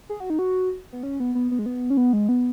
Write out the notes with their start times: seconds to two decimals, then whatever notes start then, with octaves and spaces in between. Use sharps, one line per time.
0.09 G#4
0.20 F#4
0.30 D#4
0.39 F#4
0.93 B3
1.03 C#4
1.20 B3
1.35 B3
1.51 B3
1.59 G#3
1.66 B3
1.90 C#4
1.97 B3
2.13 G#3
2.29 B3